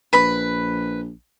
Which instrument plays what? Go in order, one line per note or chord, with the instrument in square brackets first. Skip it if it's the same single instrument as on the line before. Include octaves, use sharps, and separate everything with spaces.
[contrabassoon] A#1 [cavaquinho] B4 B5